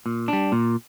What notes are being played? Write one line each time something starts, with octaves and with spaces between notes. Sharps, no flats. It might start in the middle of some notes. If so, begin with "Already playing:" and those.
A#2
G3 D4
A#2